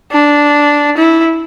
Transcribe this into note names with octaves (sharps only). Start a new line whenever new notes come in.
D4
E4